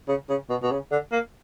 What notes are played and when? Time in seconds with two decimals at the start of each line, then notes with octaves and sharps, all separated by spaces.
0.08 C#3
0.29 C#3
0.49 B2
0.63 B2
0.71 C#3
0.91 D3
1.12 A#3